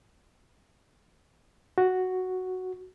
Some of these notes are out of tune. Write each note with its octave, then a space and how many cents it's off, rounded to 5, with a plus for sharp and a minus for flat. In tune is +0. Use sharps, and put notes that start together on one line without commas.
F#4 +0